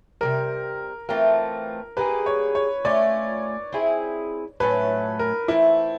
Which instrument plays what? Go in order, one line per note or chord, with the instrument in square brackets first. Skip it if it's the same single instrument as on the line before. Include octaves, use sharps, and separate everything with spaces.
[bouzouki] C3 E3 G3 [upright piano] A#4
[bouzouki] E3 A3 C4 F4 [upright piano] A#4
[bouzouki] G3 A#3 D#4 G#4 [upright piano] B4
[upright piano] C#5
C#5
[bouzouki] A3 C#4 F4 [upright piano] D5
[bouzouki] C4 E4 G#4
[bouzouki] A2 F#3 A3 C#4 [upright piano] B4
[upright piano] A#4
[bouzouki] E3 A3 C4 [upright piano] E4